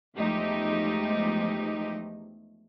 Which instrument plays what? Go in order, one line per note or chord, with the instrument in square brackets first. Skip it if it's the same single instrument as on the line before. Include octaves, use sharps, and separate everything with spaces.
[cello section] E2 F3 G#3 A3 D#4 G4